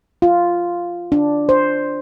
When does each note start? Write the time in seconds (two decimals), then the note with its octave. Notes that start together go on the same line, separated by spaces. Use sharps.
0.22 F4
1.12 D4
1.49 C5